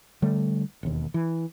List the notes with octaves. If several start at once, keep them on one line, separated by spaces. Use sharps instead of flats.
D3 G3 A3
E1 D#2
E3